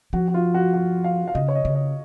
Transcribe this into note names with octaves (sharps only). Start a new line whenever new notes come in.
F3 F#4
F#4
F4
F#4
F#4
F5
F5
C#3 D#5
C#5
D#5
C#3
D#5